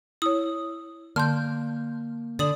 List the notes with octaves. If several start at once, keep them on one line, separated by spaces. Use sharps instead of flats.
E4 C#5 D#6
D3 A#3 A5 C6 F6 G6
D3 D5 D#6 F#7